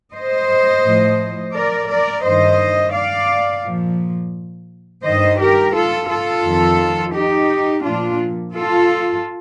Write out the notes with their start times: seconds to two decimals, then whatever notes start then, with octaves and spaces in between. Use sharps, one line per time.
0.14 C5 D#5
0.84 A2 F3
1.54 A#4 D5
1.90 A#4 D5
2.24 G2 D#3 C5 D#5
2.94 D5 F5
3.64 A#2 F3
5.04 G2 D#3 C5 D#5
5.40 G4 A#4
5.75 F4 A4
6.10 F4 A4
6.44 F2 D#3
7.15 D#4 G4
7.85 A#2 F3 D4 F4
8.54 F4 A4